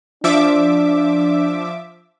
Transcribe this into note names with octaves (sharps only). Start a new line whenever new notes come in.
F3 D4 E5 D6